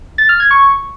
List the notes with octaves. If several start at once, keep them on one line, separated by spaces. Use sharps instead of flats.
A6
F6
G#6
C#6